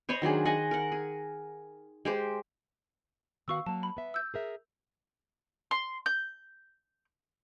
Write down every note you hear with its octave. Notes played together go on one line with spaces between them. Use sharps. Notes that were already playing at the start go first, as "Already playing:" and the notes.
C5 C#5 D#5 B5
D#3 F#3 D4 G#4
G#4 D#5 F#5 G#5
A#4 F#5
G#4
G#3 G4 C5
D#3 B3 F#4 F5 C#6 E6
F#3 A#3 A5
B5
B3 E5
E6 G6
G#4 A#4 E5
C6
G6